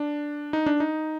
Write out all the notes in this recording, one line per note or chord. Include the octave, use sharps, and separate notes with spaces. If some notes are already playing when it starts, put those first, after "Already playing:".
Already playing: D4
D#4
D4
D#4